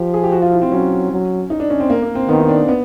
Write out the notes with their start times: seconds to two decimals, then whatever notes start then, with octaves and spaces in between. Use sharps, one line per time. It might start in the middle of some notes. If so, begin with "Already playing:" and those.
Already playing: F3 G4
0.14 G#4
0.24 G4
0.32 F#4
0.42 F4
0.52 E4
0.62 C4
0.71 F#3 C#4
1.11 F#3
1.50 D#4
1.60 D4
1.70 C#4
1.80 C4
1.90 A#3
2.02 A#3
2.15 C4
2.28 D#3 B3
2.40 D#4
2.48 D4
2.68 B3